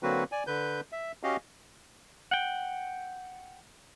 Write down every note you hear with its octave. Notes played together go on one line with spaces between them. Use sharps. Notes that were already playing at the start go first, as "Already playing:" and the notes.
D3 F#3 A#3 C4 F#4 B4
D5 G#5
D3 B4 G6
E5
C#4 F#4 G4 D#5 F5
F#5 G5